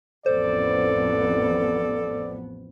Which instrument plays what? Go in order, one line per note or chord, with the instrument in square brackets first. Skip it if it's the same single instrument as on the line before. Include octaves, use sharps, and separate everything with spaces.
[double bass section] A1 F2 B3 [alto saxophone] A4 [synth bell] C5 [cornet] D5